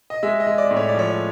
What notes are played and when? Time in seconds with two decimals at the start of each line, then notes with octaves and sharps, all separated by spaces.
0.10 D#5
0.23 G#3 E5
0.40 D#5
0.47 G#3
0.58 D5
0.71 A2
0.77 C#5
0.89 D5
0.95 F3 C#5